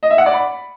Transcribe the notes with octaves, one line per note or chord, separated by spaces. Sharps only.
D#5
E5
F#5
D5
B5